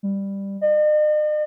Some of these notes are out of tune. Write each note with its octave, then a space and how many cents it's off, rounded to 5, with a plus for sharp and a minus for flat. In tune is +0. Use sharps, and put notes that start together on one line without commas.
G3 +10
D#5 -45